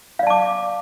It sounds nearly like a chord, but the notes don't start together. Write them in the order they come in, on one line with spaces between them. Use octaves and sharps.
F5 D5 A5 D6